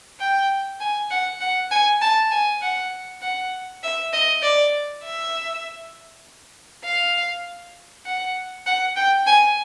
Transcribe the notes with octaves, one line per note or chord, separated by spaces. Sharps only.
G5
G#5
F#5
F#5
G#5
A5
G#5
F#5
F#5
E5
D#5
D5
E5
F5
F#5
F#5
G5
G#5